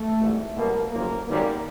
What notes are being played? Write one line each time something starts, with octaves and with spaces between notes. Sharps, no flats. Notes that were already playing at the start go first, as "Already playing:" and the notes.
Already playing: A3
G#1 G#2 E3 G3
C2 B2 F#3 A#3
F#1 F2 C#3 F3 A#3
G#1 F#2 D#3 G3 A#3